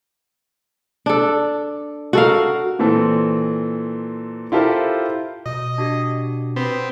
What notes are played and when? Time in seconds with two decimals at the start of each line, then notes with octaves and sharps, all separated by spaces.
1.06 D4 A4
2.13 F#4 A4 A#4 F5
2.79 A#2 E3 C4 A4
4.52 E4 F4 G4 A4 A#4 C5
5.46 B2 D#5
5.78 D4 F#4 G4
6.56 B3 C4